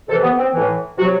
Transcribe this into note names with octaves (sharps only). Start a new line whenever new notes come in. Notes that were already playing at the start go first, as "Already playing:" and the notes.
C3 E3 A4
B3
C4
A2 E3
C3 F#3 F#4